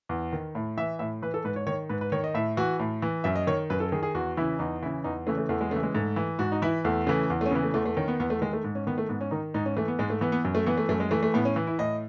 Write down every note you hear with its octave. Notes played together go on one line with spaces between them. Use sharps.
E2
D#3
A2
E3 E5
A2 E5
E3 B4
A4
G#2 B4
C#5
D#3 C#5
G#2 B4
B4
D#3 C#5
D#5
A2 E5
E3 F#4
A2
E3
F#2 E5
D#5
D#3 C#5
F#2 B4
A4
D#3 G#4
G#4
E2 F#4
C#3 E3 E4
E2 D#4
C#3 E3 E4
E2 D#4
C#3 E3 A3
A3
E2 A3
G#3
C#3 E3 A3
G#3
G#2 A3
E3
G#2 F#4
D#4
E3 E4
E2 A3
C#3 E3 A3
E2
A3
C#4
C#3 E3 B3
A3
E2 A3
A3
D#3 C#4
B3
E2 B3
A3
D#3 G#3
A3
G#2
C#4
D#3 B3
A3
G#2 B3
C#4
D#3 D#4
G#2 D#4
C#4
E3 A3
B3
G#2 G#3
A3
E3 B3
B3
F#2
A3
E3 B3
A3
F#2 A3
G#3
E3 A3
A3
A2 B3
C#4
E3
E4
A2 D#5